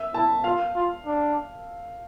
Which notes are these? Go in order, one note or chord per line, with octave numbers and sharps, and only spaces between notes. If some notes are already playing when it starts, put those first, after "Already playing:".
Already playing: E5
E4 A5
F4 F5
F4
D4